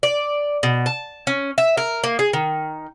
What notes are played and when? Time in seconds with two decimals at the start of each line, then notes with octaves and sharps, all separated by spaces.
0.03 D5
0.63 B2
0.86 A5
1.27 C#4
1.58 E5
1.77 A#4
2.04 A#3
2.19 G#4
2.33 D#3